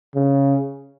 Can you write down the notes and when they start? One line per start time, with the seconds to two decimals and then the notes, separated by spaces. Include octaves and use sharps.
0.16 C#3